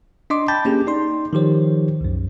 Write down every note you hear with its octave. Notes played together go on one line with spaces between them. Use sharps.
D4 D#5 C6 D6
G5 A5 B5 G6 A6
A#3 C#4 G4 G#4
D#4 D5 C6
D#3 F3 G4 C5 C#5
C2 F#2